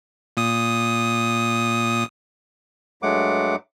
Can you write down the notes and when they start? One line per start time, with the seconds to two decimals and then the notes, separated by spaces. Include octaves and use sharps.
0.37 A#2 D#6
3.03 G2 F#3 G#3 A3 F#5 D6